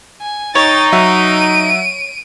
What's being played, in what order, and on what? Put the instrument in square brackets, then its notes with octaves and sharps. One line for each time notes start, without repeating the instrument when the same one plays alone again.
[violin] G#5
[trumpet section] D#4 [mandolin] C#5 [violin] G5 A6
[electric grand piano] F#3 E5 F#5 [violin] D7 D#7